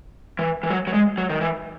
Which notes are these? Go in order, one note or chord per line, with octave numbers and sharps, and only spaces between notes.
E3
E3
F#3
F#3
G#3
F#3
D#3
E3